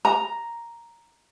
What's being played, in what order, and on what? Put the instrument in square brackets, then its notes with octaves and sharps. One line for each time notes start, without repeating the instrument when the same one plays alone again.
[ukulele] A#5